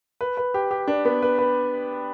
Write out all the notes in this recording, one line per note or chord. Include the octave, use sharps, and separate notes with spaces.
B4
B4
G4
G4
D4
B3
B4
B4